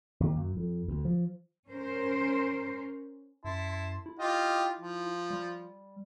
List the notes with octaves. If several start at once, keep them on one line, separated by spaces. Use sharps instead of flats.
D#2
F#2
F2
D2
F3
C#4 A#4 C5
F#2 E4 A5 C6
E4
F4 G4 D#5
F3
G3